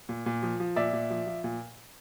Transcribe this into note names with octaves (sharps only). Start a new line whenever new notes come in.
A#2
A#2
F3
F3
A#2 D5 E5
A#2
F3
F3
A#2